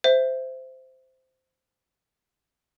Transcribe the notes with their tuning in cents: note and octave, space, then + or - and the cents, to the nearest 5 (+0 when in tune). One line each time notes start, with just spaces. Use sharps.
C5 -10 E5 +0